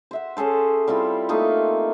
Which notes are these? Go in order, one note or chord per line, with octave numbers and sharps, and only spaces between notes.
C5 E5 F#5
C#4 G#4 A4 C5
G3 C4 E4 F4
A3 A#3 D#4 F4